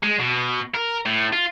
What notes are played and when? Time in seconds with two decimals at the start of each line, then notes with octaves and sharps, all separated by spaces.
0.03 G#3
0.20 B2
0.75 A#4
1.06 A2
1.33 F4